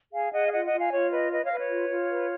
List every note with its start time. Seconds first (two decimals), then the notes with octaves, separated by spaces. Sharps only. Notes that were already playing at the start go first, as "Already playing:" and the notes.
0.12 G#4 F5 G#5
0.32 G#4 D#5 F#5
0.45 F5
0.52 F4 D#5 F#5
0.65 D#5 F#5
0.72 F4
0.79 F5 G#5
0.91 F4 C#5
1.11 B4 D#5
1.31 B4 D#5
1.44 C#5 F5
1.51 B4
1.58 C#5
1.70 F4
1.90 F4
2.11 B4